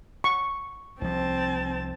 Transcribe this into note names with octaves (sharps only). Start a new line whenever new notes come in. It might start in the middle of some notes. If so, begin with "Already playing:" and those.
C#6
C2 F3 C4 A5